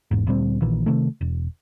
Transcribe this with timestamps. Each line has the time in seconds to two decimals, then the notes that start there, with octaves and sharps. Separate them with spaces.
0.11 G#1 E2 G#2
0.27 D2 A#2 G3 C4
0.62 A#1 A#2 D#3 E3
0.86 C3 D#3 A3
1.21 E1